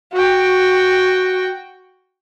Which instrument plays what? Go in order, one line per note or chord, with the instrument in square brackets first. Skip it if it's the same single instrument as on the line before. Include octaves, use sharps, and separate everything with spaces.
[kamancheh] F#4 G5